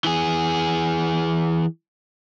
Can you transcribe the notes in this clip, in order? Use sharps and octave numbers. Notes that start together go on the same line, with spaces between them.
E3 G#4